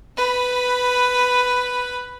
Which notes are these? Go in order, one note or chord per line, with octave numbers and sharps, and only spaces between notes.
B4 B5